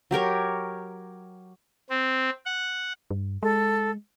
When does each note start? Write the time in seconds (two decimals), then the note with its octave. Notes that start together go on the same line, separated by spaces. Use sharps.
0.11 F#3 G4 A#4 C#5
1.90 C4
2.46 F#5
3.11 G2
3.43 G#3 A4